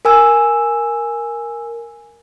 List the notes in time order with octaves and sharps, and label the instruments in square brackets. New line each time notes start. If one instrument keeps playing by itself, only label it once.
[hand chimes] A#4 G#5 E6